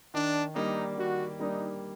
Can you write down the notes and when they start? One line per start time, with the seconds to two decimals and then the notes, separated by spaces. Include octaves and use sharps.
0.14 D#3 D4
0.55 G3 A#3 D4 D#4
0.97 D#3 F#4
1.39 G3 A#3 D4 D#4